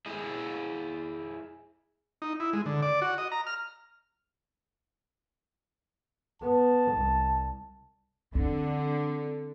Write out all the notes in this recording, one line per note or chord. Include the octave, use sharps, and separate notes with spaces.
E4 G#4 D#5
D#4
E4
G#3
D3
D5
F#4
D#5
A#5
F6
B3 A5
C2
D3 C4